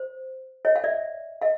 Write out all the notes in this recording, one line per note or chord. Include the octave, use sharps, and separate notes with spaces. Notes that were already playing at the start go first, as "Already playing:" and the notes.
Already playing: C5
C#5 D#5
F5
D5 E5
D#5 F5